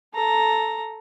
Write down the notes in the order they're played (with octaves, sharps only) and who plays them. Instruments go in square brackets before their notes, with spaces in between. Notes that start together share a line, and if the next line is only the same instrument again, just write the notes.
[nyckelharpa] A4 A#5